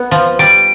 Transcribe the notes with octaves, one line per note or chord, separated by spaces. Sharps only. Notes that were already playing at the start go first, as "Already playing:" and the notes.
Already playing: B3
F3
G3 D7